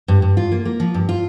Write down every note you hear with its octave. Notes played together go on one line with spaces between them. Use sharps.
G2
G2
F4
A#3
A#3
F3
G2
F4